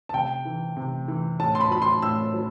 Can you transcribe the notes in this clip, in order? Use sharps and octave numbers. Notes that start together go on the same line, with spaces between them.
A5
C3 G5
E3
C3
E3
A2 A5
C6
B5
F#3 B5
C6
A2 E6
F#3